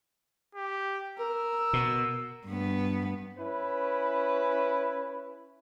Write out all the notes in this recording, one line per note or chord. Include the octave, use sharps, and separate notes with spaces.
G4
A#4 E6
B2
G2 B3
C#4 E4 B4